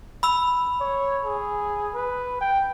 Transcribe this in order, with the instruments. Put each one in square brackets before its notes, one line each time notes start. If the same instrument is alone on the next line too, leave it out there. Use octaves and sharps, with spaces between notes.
[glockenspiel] B5 E6 F7
[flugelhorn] C#5
G#4
B4
G5